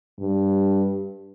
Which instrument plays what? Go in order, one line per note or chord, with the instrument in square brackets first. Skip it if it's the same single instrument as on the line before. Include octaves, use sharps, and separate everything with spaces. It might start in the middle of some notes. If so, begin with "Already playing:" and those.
[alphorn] G2